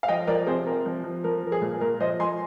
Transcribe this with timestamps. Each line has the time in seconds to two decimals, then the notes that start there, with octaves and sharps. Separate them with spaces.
0.03 F5
0.08 F3 D#5 G5
0.27 F3 A#4 D5
0.46 C3 G#4 C5
0.66 C3 A#4
0.86 F3
1.04 F3
1.24 F3 A#4
1.43 F3 A#4
1.52 G#4
1.62 A#2
1.81 A#2 A#4
2.00 F3 C5 D#5
2.20 F3 G#5 C6